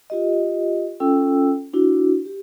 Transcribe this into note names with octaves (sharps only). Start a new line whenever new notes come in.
F4 G4 D#5
C#4 F4 A4 G5 E6
D4 E4 F#4
G4